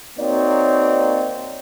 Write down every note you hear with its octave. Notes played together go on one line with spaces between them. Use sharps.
A#3 C4 D#4 F#4 C#5 D5